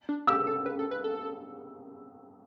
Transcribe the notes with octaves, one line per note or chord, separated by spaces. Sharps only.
D4
G4 E6
A4
B4
A4
B4
A4